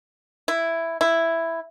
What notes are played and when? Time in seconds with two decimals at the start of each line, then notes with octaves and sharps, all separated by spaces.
0.48 E4
1.01 E4